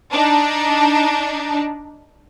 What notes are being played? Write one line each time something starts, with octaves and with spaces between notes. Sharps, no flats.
D4 D#4